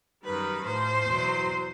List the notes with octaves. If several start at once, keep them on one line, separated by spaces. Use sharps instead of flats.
F#2 D#3 G3 B4
A2 F3 C5
E2 B2 F#3